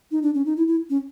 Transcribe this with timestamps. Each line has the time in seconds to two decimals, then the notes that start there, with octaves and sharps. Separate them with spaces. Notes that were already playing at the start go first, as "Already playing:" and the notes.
0.11 D#4
0.23 D4
0.35 C#4
0.46 D#4
0.57 E4
0.68 E4
0.90 C#4